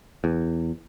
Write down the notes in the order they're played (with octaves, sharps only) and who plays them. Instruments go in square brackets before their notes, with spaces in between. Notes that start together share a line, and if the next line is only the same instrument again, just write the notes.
[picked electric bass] E2